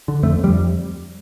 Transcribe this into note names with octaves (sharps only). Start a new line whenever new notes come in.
D3
F2 A3
F2
G3